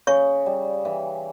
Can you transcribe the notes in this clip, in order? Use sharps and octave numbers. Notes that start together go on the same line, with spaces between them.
C#3 C#5 C#6
G3
E3